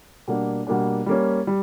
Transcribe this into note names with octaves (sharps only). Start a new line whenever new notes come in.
B2 G3 A#3 D4
B2 G3 A#3 D4
G3 A#3 C#4
G3